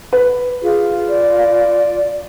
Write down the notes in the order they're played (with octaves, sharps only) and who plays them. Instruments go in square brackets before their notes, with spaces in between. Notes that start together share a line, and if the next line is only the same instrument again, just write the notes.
[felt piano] B4
[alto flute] F4 [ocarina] G#4
[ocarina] D5